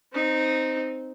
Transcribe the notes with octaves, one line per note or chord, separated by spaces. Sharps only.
C4 D#4